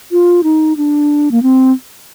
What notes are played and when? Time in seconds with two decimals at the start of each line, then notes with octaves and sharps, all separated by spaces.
0.12 F4
0.44 D#4
0.77 D4
1.31 A#3
1.43 C4